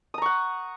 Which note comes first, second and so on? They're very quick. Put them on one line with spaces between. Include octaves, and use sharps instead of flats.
D#6 A#5 C#6 F#5